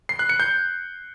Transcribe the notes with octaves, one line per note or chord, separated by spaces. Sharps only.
C7
F#6
C#7
G6